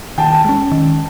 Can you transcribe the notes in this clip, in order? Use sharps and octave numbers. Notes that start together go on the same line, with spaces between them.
D#3 G5 A5
G#3 C#4
D#3